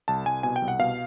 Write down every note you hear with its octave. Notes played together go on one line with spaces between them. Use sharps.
C2 A5
C2 G#5
B2 G#5
G5
C2
F#5
B2 F5